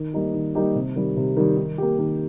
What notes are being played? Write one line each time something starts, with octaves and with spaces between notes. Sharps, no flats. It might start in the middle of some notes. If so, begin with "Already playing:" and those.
Already playing: D#3
G3 A#3 D#4 G4
D#3
G3 A#3 D#4 G4
C3
D#3 G3
C3
D#3 G3
D#3
A#3 G4
D#3